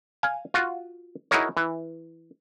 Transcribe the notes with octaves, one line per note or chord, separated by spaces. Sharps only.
F5 G#5
F4 F#4
D#4 E4 F#4 G#4 A#4 C#5
E3